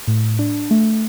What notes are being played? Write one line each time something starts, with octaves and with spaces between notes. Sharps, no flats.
A2
D4
A3